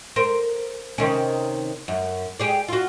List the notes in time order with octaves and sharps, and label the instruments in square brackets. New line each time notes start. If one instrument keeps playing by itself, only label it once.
[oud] A#4 C5
C3 D#3 C#4
F#2
G4 G#4 D5
F4 F#4